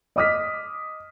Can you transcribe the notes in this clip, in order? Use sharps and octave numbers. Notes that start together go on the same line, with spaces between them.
D#5 D6 D#6 F6 B6